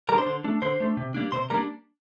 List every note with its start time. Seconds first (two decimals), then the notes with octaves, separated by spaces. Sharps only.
0.09 G3 A#4 A#5
0.14 D4 C5 C6
0.26 D3
0.44 A3 D4
0.62 D3 C5 C6
0.80 A3 D4
0.97 C3
1.14 G3 A#3 D4
1.32 C3 C5 C6
1.50 G3 A#3 D4 A#4 A#5